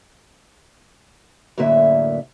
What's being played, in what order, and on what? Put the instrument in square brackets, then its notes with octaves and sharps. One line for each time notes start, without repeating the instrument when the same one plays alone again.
[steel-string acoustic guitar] F#2 A2 D3 A#3 E5